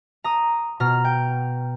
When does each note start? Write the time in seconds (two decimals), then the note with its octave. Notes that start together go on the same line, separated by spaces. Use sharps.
0.24 A#5 D#6
0.80 B2 A#5 F6
1.05 G5